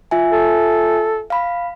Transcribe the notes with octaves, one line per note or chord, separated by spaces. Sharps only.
F4 E5 G#5
A4
F5 B5